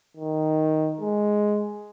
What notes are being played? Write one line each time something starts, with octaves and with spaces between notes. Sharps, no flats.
D#3
G#3